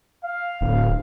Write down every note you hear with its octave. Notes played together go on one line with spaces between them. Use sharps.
F5
D1